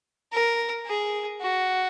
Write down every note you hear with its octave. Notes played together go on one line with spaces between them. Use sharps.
A#4
G#4
F#4